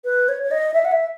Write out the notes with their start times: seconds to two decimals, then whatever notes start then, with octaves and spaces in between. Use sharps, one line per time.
0.05 B4
0.29 C#5
0.43 C#5
0.51 D#5
0.74 E5
0.85 F#5
0.92 E5